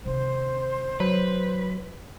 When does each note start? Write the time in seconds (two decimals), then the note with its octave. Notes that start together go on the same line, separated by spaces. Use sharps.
0.05 C3 D#3 C5
1.00 F#3 B4